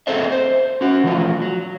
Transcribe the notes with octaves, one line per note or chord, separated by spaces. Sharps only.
C4 G#4 A4 C5 D#5 E5
C5
C#4 F#4
E3 F3 A3 F4 F#4
F#3